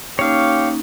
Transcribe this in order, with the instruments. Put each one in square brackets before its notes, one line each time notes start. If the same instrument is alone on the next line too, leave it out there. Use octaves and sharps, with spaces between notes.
[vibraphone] A#3 C#4 D#4 [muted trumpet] G4 [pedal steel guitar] C#5 F5